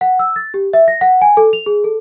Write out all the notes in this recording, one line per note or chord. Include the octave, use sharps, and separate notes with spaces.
F#5
E6
A6
G4
E5
A#6
F#5
G#5
A4
F7
G#4
A4